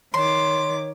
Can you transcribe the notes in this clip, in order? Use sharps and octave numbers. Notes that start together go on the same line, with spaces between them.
D#3 C#5 C6 D6